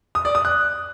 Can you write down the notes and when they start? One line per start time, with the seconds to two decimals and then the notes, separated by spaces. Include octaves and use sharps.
0.15 D#6
0.25 D5
0.35 D#6
0.45 F#6